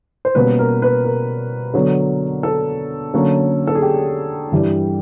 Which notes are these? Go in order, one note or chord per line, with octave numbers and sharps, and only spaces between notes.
C5
B2 G3 A#3 C#4 B4
A#4
B4
A#4
D3 F#3 B3
A4
D3 F#3 A#3 C#4
A4
G#4
G4
G2 E3 G3